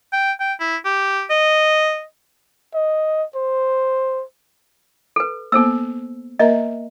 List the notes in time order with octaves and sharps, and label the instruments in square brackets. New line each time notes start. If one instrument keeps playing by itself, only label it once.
[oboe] G5
G5
E4
G4
D#5
[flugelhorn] D#5
C5
[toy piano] A4 B4
[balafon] A#3 B3 [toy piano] A4 C5 E6
[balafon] A#3 A#4 A#5 [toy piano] D#5 E5